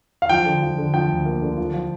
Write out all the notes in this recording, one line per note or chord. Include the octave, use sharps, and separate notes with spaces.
F5
F3 G5
D3
F3
D3
F3 G5
D2
A#3
D3
F3
F3